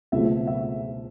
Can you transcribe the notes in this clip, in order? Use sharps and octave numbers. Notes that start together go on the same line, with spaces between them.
C#2 B2 F#3 A3 C4 E5
E5